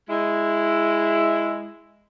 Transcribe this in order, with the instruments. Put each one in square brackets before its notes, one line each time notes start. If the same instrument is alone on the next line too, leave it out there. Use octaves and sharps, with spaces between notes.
[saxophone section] G#3 E4